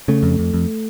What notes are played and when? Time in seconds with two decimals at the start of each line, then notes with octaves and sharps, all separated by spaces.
0.08 C#3 A3
0.23 F2
0.39 F2
0.54 F2